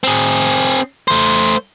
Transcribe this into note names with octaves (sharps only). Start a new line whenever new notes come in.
C4 G#4
A3 C5